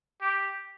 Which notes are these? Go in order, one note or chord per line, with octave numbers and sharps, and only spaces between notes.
G4